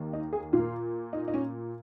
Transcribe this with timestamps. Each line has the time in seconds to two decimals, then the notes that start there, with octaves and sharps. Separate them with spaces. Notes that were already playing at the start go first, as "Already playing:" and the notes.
Already playing: D#2 D#3 A#3
0.13 D#4
0.33 G#4
0.53 A#2 A#3 F4
1.13 D#4
1.28 D#4
1.34 C#4